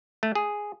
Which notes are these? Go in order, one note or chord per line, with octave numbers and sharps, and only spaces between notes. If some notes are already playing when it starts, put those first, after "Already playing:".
A3
G#4